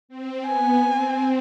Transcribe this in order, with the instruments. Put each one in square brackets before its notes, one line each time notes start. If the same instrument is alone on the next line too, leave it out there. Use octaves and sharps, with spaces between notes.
[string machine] C4
[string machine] B3 [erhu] G#5
[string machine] C4